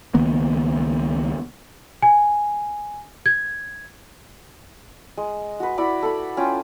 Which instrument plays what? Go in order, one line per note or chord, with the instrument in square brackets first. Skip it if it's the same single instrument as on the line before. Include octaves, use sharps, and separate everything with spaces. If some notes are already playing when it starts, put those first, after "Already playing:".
[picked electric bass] C#2 D#3 A#3 B3
[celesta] G#5
G#6
[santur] G#3
F#4 B4
E4 F#4 D5 B5
A4 B5
C#4 F4 G5